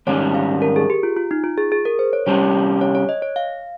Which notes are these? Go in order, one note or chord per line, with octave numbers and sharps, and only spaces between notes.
G#2 D#3 G3 C#4 C#5
F5
A#4
G#4
G4
F4
F4
D#4
F4
G#4
G#4
A#4
C5
C#5
C3 G3 C#4 G4 C#5
C#5
C#5
D#5
C#5
F5